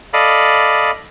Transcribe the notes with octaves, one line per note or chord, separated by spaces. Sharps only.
A4 D5 D#5 F5 B5